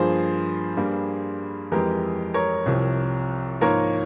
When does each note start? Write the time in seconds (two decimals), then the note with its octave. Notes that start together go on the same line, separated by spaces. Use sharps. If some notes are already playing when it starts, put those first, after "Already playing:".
Already playing: G2 F3 A#3 G#4 C5
0.76 G2 G3 A#3
1.72 F2 E3 G#3 G4 A#4
2.34 A#4 C#5
2.66 C2 C3 F3
3.61 G#2 F3 A#3 A#4 C#5